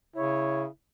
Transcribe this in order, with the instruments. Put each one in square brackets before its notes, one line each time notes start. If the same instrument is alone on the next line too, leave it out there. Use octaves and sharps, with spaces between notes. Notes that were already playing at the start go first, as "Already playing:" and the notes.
[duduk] C#3 [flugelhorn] E4 [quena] C#5